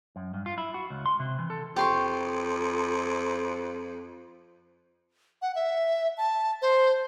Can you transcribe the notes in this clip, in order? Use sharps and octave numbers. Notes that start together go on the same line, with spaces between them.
F#2
G2
F4
E4
F#4
C#2
C6
C3
E3
A4
F2 G4 C6 C#6
F#5
E5
A5
C5